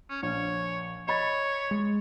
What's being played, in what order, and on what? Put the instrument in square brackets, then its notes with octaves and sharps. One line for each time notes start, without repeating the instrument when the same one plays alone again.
[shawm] C#4
[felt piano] A#1 [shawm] C#5
[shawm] C#5 [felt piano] D#5 B5 A6
[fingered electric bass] G#3